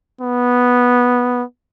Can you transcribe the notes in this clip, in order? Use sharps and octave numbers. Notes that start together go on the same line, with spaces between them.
B3